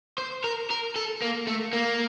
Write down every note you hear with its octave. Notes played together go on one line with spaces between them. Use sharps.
C5
A#4
A#4
A4
A#3
A3
A#3